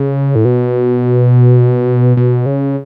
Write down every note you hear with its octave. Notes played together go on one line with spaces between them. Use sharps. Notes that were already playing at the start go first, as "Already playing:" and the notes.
Already playing: C#3
A2
B2
B2
C#3